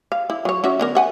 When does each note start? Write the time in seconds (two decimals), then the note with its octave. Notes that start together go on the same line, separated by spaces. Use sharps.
0.12 F5
0.30 E4
0.45 F#3 C#5
0.64 C#4 F#4 E5
0.80 D3 B3 A#4
0.95 E5 F#5 G#5